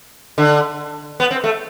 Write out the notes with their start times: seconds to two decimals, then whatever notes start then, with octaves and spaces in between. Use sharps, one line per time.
0.38 D3
1.20 B3
1.31 C4
1.44 A3